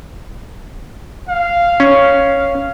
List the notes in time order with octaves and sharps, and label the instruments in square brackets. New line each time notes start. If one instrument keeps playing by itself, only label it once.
[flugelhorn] F5
[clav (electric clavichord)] C#4